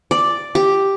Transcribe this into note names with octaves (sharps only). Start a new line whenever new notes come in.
D5
G4